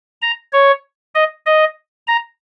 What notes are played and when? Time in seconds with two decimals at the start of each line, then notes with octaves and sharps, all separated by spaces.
0.22 A#5
0.53 C#5
1.15 D#5
1.46 D#5
2.07 A#5